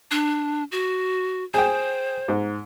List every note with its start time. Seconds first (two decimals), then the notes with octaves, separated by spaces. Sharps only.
0.11 D4
0.72 F#4
1.54 G#4 C5 G5
2.28 G#2